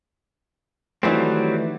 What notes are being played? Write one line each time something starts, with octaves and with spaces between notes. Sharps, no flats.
D#3 E3 F#3 G3 A3 C4